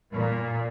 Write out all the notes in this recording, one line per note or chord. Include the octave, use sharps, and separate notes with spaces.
A#2